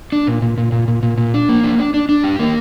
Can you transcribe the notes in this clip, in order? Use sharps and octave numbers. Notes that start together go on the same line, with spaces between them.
D4
A#2
A#2
A#2
A#2
A#2
A#2
A#2
D4
A#3
D4
D4
D4
D4
G4
A#3